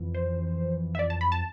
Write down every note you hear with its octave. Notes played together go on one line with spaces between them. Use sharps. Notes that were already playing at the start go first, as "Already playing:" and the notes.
Already playing: F2 E3
C5
E5
D5
A5
B5
A5